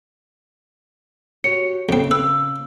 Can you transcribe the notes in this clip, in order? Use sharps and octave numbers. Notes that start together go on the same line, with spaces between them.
F#4 G4 C#5 C#7
F2 C#3 C4
B4 E6